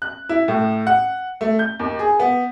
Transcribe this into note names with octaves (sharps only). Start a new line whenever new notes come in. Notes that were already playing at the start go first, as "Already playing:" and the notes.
F#6
E4
A2
F#5
A3
G6
D#2
G#4
B3